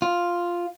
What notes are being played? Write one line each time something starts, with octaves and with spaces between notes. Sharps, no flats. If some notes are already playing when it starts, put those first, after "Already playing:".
F4